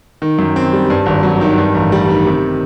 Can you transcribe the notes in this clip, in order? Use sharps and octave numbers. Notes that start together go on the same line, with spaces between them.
D#3
F#2
C4
G3
G2
G#1
F#3
D#3
G2
A1
G3
D#3
C3